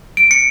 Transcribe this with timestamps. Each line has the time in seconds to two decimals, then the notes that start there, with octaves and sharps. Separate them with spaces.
0.17 D7
0.31 C#7